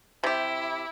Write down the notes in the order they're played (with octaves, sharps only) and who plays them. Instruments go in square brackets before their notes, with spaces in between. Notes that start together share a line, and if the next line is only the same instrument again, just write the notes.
[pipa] C3 G4 [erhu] E4